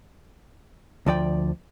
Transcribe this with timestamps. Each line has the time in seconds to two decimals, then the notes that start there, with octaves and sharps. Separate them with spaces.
1.06 D2 F3 D5 G5